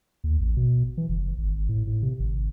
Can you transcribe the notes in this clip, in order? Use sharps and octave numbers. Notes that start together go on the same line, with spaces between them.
D#2
A1
B2
E3
F#1
G#1
A2
A2
C3
G#1